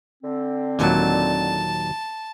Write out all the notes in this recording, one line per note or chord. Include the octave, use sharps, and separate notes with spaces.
D3 C4
D#2 A#2 F#3 A5